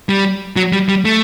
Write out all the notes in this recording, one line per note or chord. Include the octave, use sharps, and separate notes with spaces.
G3
F#3
G3
G3
A3